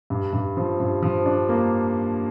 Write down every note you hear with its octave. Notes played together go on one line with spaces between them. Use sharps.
G2
G2
F3
G2
F3
D4
A#3